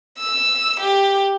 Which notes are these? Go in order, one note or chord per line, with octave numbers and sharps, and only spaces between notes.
E6
G4